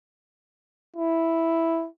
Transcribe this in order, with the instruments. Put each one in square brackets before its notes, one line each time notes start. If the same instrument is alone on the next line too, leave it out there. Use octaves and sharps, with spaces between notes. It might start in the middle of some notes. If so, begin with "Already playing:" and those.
[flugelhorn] E4